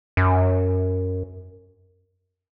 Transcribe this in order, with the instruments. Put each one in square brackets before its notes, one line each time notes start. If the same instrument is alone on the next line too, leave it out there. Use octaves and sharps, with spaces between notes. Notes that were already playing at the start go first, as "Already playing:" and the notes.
[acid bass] F#2